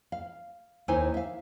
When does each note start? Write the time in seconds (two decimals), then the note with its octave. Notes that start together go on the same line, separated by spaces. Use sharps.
0.12 F5
0.88 D#2 D#4 E4 C5 G#5
1.14 E5 F5